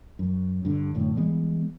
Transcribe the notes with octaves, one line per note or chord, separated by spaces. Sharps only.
F#2
G2 D3
F#1 F#2 A2 D3
E3 G3 G#3 B3